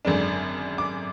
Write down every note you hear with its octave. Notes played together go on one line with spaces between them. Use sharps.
G#1 F#2 D3 G#3 D4
D6